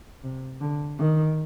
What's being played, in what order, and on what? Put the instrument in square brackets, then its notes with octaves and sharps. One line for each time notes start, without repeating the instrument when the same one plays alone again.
[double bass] C3
D3
D#3